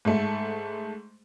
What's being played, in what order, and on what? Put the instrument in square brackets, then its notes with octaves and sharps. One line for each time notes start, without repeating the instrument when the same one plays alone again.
[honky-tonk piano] G#2 A3